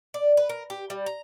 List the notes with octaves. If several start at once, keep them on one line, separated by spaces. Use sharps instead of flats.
D5
B4
A#4
G4
G3
A#5